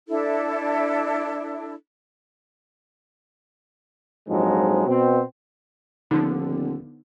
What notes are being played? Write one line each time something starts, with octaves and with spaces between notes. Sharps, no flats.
D4 E4 A4
A#1 F2 G#2 F3 F#3 G#3
B2 C4
D#1 D3 F3 B3 D#4